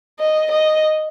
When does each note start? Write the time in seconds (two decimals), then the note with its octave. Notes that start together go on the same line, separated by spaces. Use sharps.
0.20 D#5
0.51 D#5